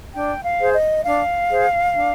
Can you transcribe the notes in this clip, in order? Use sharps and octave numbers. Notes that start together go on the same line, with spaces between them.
D4 G5
F5
G#4 C5
D#5
D4 F5
G#4 C5
D4